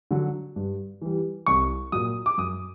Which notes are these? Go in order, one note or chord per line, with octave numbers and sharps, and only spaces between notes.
D3 F#3
G2
E3 G3
C2 C#6
A#2 F#3 D#6
D6
F#2 D#6